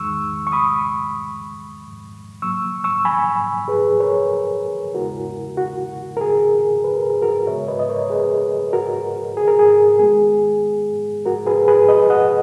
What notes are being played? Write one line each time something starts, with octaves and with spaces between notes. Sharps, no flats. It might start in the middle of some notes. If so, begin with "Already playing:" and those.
Already playing: E2 D#3 G#3 C#6 E6
C#6
B5 D#6
G#2 F#3 A#3 C#6 E6
C#6 E6
G#5 B5
G#4 B4
A#4 C#5
E2 C#3 G#3 B3 E4 F#4 A#4
F#4
A#4
G#4
B4
A#4
G#4
F#4 A#4
C#3 G#3 B3 C#5 E5
B4 D#5
D#5
A#4 C#5
G#4 B4
F#4 A#4
G#4
A#4
G#4
D#3 G#3 B3 G#4
F#4 A#4
G#4 B4
G#4 B4
B4 D#5
D#5 F#5